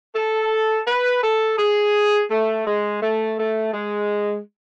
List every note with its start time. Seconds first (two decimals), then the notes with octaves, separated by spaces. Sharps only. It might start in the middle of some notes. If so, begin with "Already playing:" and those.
0.15 A4
0.87 B4
1.24 A4
1.58 G#4
2.31 A3
2.67 G#3
3.02 A3
3.39 A3
3.74 G#3